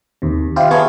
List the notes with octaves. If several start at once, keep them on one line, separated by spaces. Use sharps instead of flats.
D#2 C3
E4 F4 G4 C5
B3 E4 F4 G#4 A4 C#5